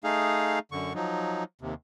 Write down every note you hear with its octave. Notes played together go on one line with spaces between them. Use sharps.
A3 D#4 G#4 F5
F#2 D3 C#6
F3 F#3 D#4
D#2 C3